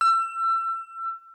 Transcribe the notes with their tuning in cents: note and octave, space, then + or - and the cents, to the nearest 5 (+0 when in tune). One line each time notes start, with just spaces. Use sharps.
E6 +30